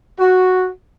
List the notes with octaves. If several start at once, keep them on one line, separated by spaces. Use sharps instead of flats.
F#4